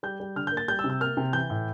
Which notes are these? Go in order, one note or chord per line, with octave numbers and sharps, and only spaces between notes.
G3 G6
G3
D3 F6
A#3 G6
A6
G3 G6
E6
C3
E6
A#3 F6
C3
E3 G6
A2